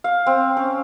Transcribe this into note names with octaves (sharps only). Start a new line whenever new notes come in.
F5
C4
C#4